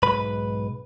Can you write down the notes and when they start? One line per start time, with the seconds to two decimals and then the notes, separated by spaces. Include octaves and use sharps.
0.03 B1 G#2 B4 B5